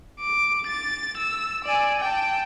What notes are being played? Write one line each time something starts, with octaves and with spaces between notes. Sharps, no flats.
D6
A6
E6
D5 G#5
G5 A5